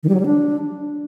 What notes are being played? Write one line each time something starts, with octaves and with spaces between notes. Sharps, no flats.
D#3
G3
F#3
G3
D4